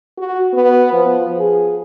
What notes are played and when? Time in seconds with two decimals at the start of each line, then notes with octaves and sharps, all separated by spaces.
0.18 F#4
0.54 B3
0.93 F3
1.37 G#4